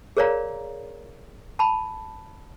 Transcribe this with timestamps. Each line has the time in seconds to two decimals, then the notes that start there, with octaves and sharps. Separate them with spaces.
0.17 G#4 A#4 C#5 D5 F5 A#5
1.59 A5 B5